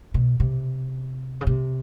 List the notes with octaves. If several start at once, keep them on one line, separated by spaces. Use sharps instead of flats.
B2
C3
C#3
C3